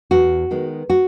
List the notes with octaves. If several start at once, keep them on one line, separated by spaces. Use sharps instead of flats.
E2 F#4
D#3 G#3 B3
F#4